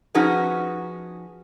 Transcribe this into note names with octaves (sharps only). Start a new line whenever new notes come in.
F3 C#4 D#4 F#4 G#4 B4